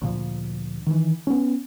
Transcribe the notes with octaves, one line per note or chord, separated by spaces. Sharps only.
D2 A#2 F3
D#3 E3
B3 C#4